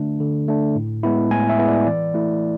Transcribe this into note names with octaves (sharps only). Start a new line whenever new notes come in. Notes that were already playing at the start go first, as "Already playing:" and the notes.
Already playing: D3 A3 D4
D3
A3 D4
A2
G#3 B3 E4
A2 G#5
E5
G#3 B3 E4
D5
E3 D5
A3 E4